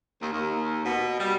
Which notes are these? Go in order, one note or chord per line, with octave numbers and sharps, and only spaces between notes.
D#2
D#2
B2
G3